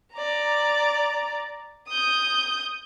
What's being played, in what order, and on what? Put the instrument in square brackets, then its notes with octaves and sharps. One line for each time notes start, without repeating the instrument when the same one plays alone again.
[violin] D5 A#5
D#6 G6